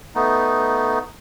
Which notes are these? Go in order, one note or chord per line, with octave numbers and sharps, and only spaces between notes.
A3 B3 D#4